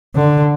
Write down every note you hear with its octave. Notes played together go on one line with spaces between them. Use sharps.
D3